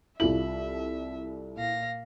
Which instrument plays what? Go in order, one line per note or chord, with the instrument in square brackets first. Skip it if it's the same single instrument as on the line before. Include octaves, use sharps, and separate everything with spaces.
[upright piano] C2 F4 F#7 [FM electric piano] E4 A4 [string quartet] E5
[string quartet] A#2 F5 A#6